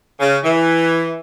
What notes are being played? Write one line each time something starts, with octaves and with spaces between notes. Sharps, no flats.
C#3
E3